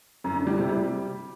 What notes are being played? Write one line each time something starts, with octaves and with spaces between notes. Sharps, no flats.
F#2
D3
G3
C3
G3